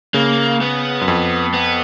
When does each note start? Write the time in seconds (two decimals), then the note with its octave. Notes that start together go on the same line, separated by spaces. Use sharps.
0.14 C#3 A#3
0.61 B3
1.01 F#2
1.08 F2
1.54 B3